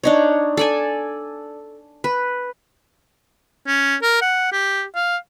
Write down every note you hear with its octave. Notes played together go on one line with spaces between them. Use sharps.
D4 D#4 C#5
A4 D5 G#5
B4
C#4
A#4
F#5
G4
F5